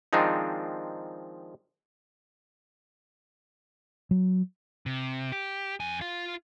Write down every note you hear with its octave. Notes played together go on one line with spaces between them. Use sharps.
D#3 F3 G#3 C4 D4 D#4
F#3
C3
G4
F2 G#5
F4 F5